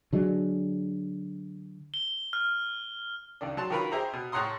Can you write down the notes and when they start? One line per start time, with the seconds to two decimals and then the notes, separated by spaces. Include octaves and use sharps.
0.13 D3 F#3 G#3 D4
1.94 G7
2.33 F6
3.41 C#2 D#3 D4
3.57 F#3 A5 C6
3.70 D#3 F4 F#4 A#4 B4 B5
3.92 G4 G#4 C5 E5 A#5
4.13 B2
4.32 A2 C#5 F#5 A#5 C6 D#6